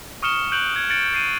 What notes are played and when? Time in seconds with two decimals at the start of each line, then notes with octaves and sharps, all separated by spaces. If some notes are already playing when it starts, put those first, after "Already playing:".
0.22 C#6 D#6 F6 C#7 E7 G7
0.52 C#6 F#6 G6 D7 F7 F#7
0.74 D#6 G#6 C#7
0.90 A6 C#7 D7 F#7
1.13 A6 C7 D#7